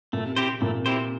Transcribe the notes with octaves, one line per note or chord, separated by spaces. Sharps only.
A#2 A3
C3
C3 C4 E4 G4 C5
C3
A#2 A3
C3 C4 E4 G4 C5